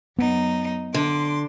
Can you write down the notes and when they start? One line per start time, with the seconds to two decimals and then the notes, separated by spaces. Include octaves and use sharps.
0.19 F#2 B3 D#4
0.94 D3 C6 D6